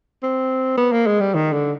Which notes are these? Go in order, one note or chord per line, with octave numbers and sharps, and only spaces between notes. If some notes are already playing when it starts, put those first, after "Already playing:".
C4
B3
A#3
G#3
G3
D#3
D3